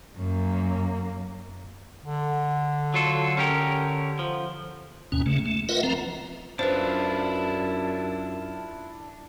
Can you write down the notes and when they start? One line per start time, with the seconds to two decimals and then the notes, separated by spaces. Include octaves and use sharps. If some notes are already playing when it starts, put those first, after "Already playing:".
0.17 F#2 A#3
2.03 D3
2.94 F#3 F4 A4
3.37 C#4 G4 A#4
4.19 F3
5.12 D#2 B2 C#4
5.26 C#3 A3
5.46 A3
5.69 F4 A#4 B4 D#5 E5 F#5
5.83 F3 C4 A#5
6.59 F#2 D4 E4 F4 B4 C5